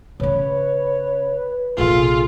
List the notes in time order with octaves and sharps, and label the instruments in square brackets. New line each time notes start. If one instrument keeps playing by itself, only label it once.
[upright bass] C#3 C#4 [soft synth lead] B4 [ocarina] C#5
[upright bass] A#1 C3 [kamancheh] F4 [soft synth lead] G#4 [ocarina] A4